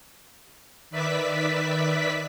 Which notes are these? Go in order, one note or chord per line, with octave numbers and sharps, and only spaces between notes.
D#3 B4 D5 E5 B6